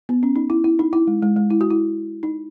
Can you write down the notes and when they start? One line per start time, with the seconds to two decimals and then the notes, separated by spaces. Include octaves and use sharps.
0.09 B3
0.23 C#4
0.36 D#4
0.50 E4
0.64 E4
0.79 D#4
0.93 E4
1.07 G#3
1.23 G#3
1.36 G#3
1.50 E4
1.61 F#4
1.71 E4
2.23 D#4